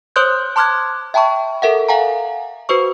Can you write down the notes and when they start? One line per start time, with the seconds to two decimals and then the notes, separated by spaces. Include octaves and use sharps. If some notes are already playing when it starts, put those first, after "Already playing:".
0.16 C5 C#5 C6 D#6 F#6 G6
0.56 A5 C6 D6 F6 F#6 G#6
1.14 E5 G5 A5 B5 C#6
1.62 A4 A#4 E5 F#5
1.89 F5 F#5 G#5 A#5
2.69 F#4 B4 C5 C#6